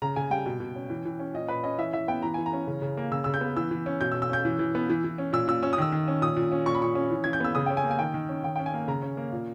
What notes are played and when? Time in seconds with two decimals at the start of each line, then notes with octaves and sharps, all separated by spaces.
0.02 C#3 A#5
0.16 C#3 G#5
0.30 G3 G5
0.46 B2
0.60 B2
0.75 C#4
0.90 E3
1.05 E3
1.19 C#4
1.34 A#2 D#5
1.48 A#2 B4
1.63 C#4 D#5
1.78 E3 E5
1.93 E3 E5
2.08 B3 G5
2.22 E3 A#5
2.34 E3 G#5
2.46 A#5
2.53 C#4
2.67 C#3
2.82 C#3
2.97 A#3
3.12 C#3 E6
3.24 C#3 E6
3.34 G6
3.41 B3
3.57 E3 E6
3.71 E3
3.86 C#4
4.01 B2 G6
4.12 E6
4.15 B2
4.22 E6
4.29 C#4 G6
4.45 E3
4.59 E3
4.75 B3
4.90 E3
5.04 E3
5.18 C#4
5.33 A#2 E6
5.48 A#2 E6
5.63 C#4 E6
5.73 D#6
5.78 D#3 E6
5.92 D#3
6.08 C#4
6.21 A#2 D#6
6.37 A#2
6.52 C#4
6.66 A#2 C#6
6.75 B5
6.81 A#2 C#6
6.95 C#4
7.10 E3
7.24 E3 G#6
7.33 G6
7.40 B3 E6
7.55 C#3 D#6
7.66 C#4 G5
7.77 G#5
7.84 A#3
7.91 G#5
7.99 D#3 G5
8.14 D#3
8.29 C#4
8.43 D#3 G5
8.56 C#4 G5
8.66 G#5
8.74 A#3
8.88 C#3 A#5
9.02 C#4
9.17 A#3
9.32 A#2